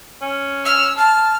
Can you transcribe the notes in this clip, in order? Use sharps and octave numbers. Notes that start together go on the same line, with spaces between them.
C#4
E6 F6
A5 F6